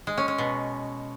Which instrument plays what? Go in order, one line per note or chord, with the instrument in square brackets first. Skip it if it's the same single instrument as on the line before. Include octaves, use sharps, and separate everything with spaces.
[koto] G#3
C#4
C#4
B2